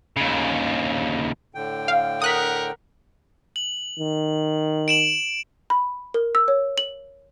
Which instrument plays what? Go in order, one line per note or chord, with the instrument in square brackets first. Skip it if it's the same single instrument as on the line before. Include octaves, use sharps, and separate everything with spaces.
[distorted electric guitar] D#2 C#3
[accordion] A2 D3 G5
[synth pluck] F5
[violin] A#4 F#5 [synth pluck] D#6 F#6 B6
[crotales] F#7
[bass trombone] D#3
[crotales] D7 E7 F#7
[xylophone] B5
A#4
E6
C#5
F#7